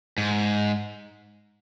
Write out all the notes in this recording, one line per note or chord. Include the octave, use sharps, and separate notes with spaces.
G#2